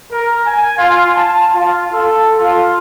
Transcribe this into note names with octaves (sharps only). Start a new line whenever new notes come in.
A#4
G#5
F4
A5
F4
A4
F4